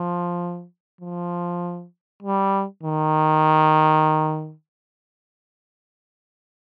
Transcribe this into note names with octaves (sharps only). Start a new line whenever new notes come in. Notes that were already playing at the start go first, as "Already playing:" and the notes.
Already playing: F3
F3
G3
D#3